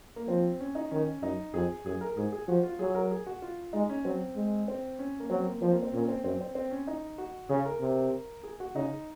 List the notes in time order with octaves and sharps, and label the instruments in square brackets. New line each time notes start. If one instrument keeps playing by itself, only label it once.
[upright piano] A#3
[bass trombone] F3 [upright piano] C4
[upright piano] C#4
D#4
[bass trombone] D#3 [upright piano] C#4
[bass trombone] F#2 [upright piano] D#4
[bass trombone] F2 [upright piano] G#4
[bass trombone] F#2 [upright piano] G#4
[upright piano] A#4
[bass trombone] G#2 [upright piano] G#4
[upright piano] G#4
[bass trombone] F3 [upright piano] F#4
[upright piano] F4
[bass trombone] F#3 [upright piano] G#4
[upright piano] A#4
G#4
F#4
F4
[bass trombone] G#3 [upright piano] D#4
[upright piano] C#4
[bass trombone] F#3 [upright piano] C4
[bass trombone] G#3
[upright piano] C4
C#4
A#3
[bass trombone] F#3 [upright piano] C4
[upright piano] A#3
[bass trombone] F3 [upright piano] C4
[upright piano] A#3
C4
[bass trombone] A#2 [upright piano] C#4
[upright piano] A#3
C4
[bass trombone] F#2 [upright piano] C4
[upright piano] C4
C4
C#4
D#4
F#4
[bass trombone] C#3 [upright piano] G#4
[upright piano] A#4
[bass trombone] C3
[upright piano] G#4
F#4
[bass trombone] C#3 [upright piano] D#4